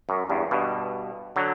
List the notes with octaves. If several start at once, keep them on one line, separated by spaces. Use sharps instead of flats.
F#2
E2 G2
G2 B2
D3 F#3